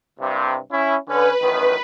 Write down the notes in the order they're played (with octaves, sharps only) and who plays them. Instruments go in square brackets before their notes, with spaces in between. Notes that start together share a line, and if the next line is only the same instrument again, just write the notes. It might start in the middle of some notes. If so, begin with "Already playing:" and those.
[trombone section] C2 G2 C3
C#4 E4
[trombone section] D3 C#4 [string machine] B4
[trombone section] A1 F#2 D#3